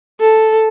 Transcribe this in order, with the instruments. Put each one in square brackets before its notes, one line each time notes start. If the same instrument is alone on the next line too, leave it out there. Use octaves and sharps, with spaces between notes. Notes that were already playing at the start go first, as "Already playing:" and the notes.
[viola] A4